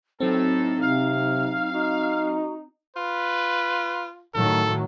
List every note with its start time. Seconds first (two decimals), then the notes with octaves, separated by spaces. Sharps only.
0.20 A2 F#3 C4 D#4 A4
0.81 C3 F5
1.73 D#4 F#4
2.96 F4 B4
4.34 A2 D#3 F#3 A4